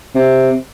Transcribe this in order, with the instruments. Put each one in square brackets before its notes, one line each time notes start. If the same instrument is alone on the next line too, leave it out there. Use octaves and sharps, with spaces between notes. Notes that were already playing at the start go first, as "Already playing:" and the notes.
[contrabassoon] C3